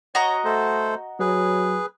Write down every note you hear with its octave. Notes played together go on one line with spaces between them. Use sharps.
F#4 C#5 D#5 A#5
A3 A4 C5
F#3 G#4 B4